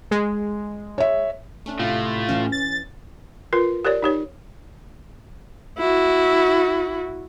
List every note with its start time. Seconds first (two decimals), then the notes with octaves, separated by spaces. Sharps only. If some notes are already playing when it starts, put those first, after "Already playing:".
0.11 G#3
0.98 C#5 E5
1.66 A3 C#4 D4
1.79 A2 C3 A3 F4
2.29 E3 C#4
2.52 A6
3.53 F4 A#4 B4
3.85 G4 A#4 C#5 D5
4.02 D#4 G4 C#5
5.78 E4 F#4